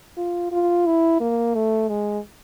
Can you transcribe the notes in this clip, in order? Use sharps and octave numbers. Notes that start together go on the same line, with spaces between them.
F4
F4
E4
A#3
A3
G#3